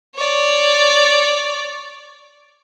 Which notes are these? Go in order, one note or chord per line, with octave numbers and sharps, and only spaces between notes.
C#5 D5